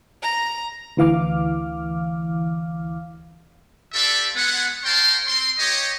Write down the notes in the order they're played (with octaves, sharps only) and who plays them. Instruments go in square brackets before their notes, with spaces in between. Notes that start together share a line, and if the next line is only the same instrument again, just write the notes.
[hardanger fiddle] A#5
[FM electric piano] D2 E3 F5 D6 F6
[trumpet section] D4 F4 G4 A4 D5 E5
G#3 B3 F#5
A#4 C#5 F5 G5 A5 C6
C4 C6
G4 C#5 D#5